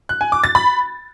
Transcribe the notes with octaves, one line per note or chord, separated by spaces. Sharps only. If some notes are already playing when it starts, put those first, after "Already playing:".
F#6
G#5
D6
A6
B5